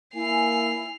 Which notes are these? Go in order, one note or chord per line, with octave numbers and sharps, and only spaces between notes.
A#3 E4 G#5 C7 F7